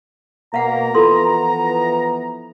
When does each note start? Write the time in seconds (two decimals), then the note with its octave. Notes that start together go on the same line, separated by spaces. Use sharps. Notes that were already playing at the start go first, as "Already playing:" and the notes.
0.54 B2 A#3 F5 F#5 A#5
0.95 E3 F3 B3 F4 A4 C6